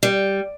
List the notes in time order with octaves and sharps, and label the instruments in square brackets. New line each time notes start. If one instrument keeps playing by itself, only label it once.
[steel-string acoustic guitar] G3